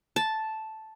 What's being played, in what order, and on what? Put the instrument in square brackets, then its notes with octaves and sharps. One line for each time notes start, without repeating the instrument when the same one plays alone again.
[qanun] A5